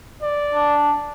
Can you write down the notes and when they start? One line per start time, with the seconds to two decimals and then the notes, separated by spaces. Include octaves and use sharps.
0.22 D5
0.55 D4